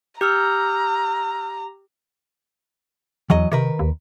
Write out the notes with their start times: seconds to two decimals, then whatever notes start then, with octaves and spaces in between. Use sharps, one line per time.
0.21 G4 A#5 E6 F6 G6
3.30 E2 E3 F#3 D#5
3.52 C3 D#3 A#4 B4
3.79 D#2